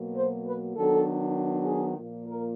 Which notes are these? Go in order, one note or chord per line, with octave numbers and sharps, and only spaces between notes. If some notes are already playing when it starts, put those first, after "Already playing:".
Already playing: B2 F#3 A#3
C5
B4
D#3 F#3 B3 D4 A4
G#4
A#2 F3 A#3
A#4